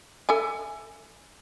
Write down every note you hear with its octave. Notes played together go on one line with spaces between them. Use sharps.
A4 E5 G#5